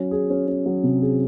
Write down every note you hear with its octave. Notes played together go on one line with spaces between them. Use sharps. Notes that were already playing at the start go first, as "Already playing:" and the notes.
Already playing: F#3 C#4
G#4
C#4
C#4
F#3
C3
G#4